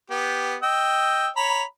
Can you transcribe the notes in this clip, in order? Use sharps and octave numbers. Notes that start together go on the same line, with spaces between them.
B3 G4
D#5 G5 E6
C#5 A#5 B5